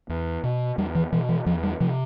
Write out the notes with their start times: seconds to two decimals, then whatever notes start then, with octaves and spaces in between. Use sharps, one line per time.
0.09 E2
0.43 B2
0.78 E2 G3
0.95 E3
1.12 B2 E3
1.29 E3
1.46 E2 F3
1.63 G3
1.80 C3 F3